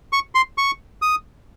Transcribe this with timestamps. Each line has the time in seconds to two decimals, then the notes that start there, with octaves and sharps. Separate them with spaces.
0.13 C#6
0.35 C6
0.58 C#6
1.02 D#6